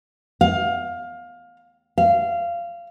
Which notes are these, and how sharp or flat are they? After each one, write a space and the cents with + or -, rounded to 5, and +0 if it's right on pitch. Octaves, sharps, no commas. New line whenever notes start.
F5 +20
F5 -20